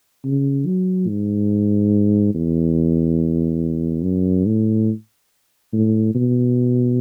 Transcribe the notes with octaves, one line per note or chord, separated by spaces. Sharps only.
C#3
F#3
G#2
E2
F#2
A2
A2
B2